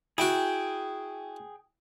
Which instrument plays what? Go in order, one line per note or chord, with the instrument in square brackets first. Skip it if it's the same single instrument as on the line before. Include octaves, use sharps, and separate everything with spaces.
[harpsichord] E4 F#4 [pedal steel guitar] G#4 G5